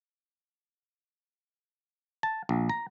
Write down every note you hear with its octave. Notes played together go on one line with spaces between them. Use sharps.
A5
A#1
A#5